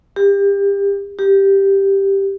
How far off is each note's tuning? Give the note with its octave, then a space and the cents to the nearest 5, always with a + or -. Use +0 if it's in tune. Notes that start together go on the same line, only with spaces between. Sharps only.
G4 +30
G4 +0